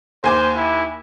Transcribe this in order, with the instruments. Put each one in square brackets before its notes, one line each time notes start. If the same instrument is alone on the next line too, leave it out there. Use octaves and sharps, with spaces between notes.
[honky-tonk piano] D#2 G#5 D6 [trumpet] C5
[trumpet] E4